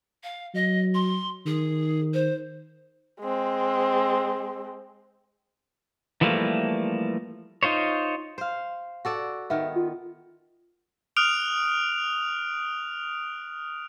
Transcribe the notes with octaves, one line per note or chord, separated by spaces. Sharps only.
F5
F#3 D#5
C6
D#3 G#4
C5
G#3 C4
E3 F3 G3 A3 A#3
D#4 F4 C5 C#5
C5 F5
F#4 A4 D5
D#3 B3 E5
F4
D#6 F6 F#6 D7 F7